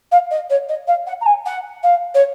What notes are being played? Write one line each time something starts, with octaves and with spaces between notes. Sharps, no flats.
F5
D#5
C#5
D#5
F5
F#5
A#5
G#5
F#5
F5
C#5